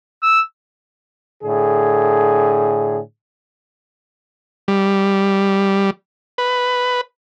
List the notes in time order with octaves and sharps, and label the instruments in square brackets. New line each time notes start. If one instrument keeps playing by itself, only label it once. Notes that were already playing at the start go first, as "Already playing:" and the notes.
[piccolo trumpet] E6
[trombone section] A2 D3 G#4
[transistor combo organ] G3
B4